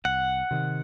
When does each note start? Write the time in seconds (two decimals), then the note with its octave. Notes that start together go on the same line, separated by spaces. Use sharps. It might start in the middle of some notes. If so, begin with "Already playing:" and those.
0.05 C2 F#5
0.51 C3 D#3